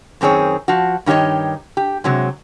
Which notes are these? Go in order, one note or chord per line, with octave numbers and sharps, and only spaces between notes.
F#2 D#3 C4 G#4 C#5
F3 F#4
G2 D#3 G4 C#5 D#5
G4
C3 F#3 G#3